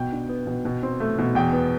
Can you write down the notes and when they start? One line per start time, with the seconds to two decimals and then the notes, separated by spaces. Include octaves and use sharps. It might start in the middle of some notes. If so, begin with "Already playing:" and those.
Already playing: B2 G5
0.12 D4
0.29 B3
0.47 B2
0.65 B2
0.83 C4
1.00 A3
1.18 B2
1.35 E2 G5
1.53 B3